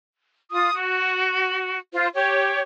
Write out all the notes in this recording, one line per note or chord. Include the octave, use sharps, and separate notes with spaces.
F4 D#6
F#4
F4 C5
G4 C#5